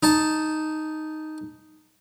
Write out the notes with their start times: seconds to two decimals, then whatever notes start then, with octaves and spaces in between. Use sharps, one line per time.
0.03 D#4 A5